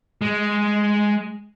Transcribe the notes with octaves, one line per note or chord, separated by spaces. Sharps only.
G#3